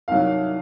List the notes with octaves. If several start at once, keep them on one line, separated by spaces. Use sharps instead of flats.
C2 C3 D#3 F#3 F5